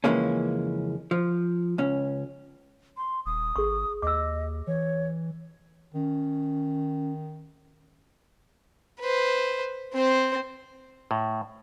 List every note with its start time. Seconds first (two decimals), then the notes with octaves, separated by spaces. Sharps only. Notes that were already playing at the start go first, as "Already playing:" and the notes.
0.04 F2 C#3 E3 G#3 A#3 C#4
1.11 F3
1.78 C#2 C#4
2.97 C6
3.26 D#1 D#6
3.56 G#1 G#4 C#6
4.02 D#2 D#5 D6 E6
4.67 E3 C#5
5.94 D#3 C#4
9.00 B4 C5
9.93 C4 C5
11.11 A2